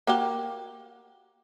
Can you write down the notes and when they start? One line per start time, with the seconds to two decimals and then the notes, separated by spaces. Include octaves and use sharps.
0.07 A#3 F#4 G4